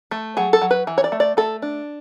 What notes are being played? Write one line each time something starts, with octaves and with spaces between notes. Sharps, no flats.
A3
F#3 G#4
A4
F#3
B4
E3
C#5
D5
A3
D5
A3 A4
D4